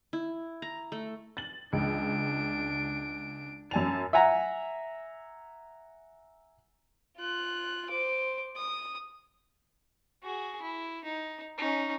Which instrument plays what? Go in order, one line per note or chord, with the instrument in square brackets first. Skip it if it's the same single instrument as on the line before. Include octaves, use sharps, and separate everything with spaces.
[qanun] E4
A#5
A3
[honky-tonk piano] A6 F#7
[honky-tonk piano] C#2 [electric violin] D4 D7
[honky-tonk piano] F#2 G#5 F7 [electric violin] A5
[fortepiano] E5 F#5 G#5 A#5
[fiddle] F4 F#6
C5 D6
D#6
[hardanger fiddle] F#4 G#4
E4
D#4
C#4 D#4